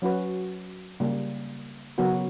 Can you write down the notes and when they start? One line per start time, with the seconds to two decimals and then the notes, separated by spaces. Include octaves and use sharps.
0.02 F#3 C#4 F#4 B4
1.00 C#3 G3 A#3
1.98 C#3 F#3 B3 F#4 A#4